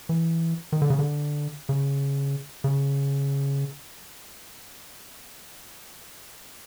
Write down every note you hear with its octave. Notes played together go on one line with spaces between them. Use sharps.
E3
D#3
D3
C#3
D3
C#3
C#3